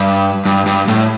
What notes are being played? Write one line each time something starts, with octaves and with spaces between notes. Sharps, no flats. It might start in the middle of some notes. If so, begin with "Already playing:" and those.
Already playing: G2
G2
G2
A2